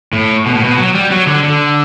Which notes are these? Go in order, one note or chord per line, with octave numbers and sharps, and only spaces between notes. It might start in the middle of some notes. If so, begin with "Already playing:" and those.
A2
B2
A2
B2
F#3
G3
F#3
D3
D3